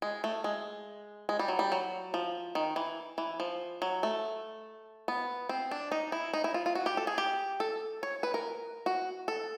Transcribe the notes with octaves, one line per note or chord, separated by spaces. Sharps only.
G#3
A3
G#3
G#3
G3
F#3
G3
F#3
F3
D#3
E3
E3
F3
F#3
A3
B3
C4
D4
D#4
E4
D#4
E4
F4
F4
F#4
G4
A4
G#4
G4
A4
C#5
B4
A#4
F#4
A4